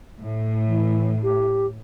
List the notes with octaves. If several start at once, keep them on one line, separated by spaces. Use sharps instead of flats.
A2
E3
G4